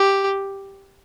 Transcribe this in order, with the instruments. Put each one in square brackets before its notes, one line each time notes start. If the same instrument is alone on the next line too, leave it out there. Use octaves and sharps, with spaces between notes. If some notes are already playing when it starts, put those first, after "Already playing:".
Already playing: [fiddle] G4